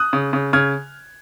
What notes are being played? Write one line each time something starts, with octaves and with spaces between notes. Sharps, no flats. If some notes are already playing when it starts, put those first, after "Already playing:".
Already playing: D#6 F#6
C#3
C#3
C#3 F6 G#6